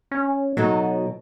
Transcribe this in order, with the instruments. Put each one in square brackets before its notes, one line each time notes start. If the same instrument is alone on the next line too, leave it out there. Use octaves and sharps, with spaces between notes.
[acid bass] C#4
[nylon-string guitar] B2 D#4 A4 [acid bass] F#3